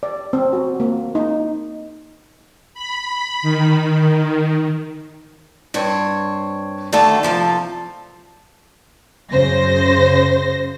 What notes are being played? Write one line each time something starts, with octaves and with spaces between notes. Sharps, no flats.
D5
C4
F#4
A#3
D#4
B5
D#3
G2 C4 C#5
D3 D#3 A3 F#4 A4 D5
C3 F3 A4
F#2 C#3 C5 A#6